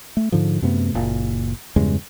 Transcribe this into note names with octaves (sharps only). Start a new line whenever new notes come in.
A3
G#2 D3 F3
F#2 C3 A3 B3
F#1 A#2
E2 G2 C#3 G#3